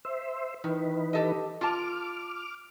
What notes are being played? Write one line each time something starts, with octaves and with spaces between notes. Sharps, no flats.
C5 E5
D#3 E3 D#4 B4
G4 A4 D#5
F4 A5 D6 F6